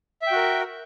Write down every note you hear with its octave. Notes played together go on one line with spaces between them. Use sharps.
F#4 A#4 E5 G5